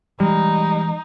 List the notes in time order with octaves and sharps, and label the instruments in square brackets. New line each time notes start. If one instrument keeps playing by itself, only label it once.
[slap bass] E3 G#3 [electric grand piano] G3 [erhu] D#4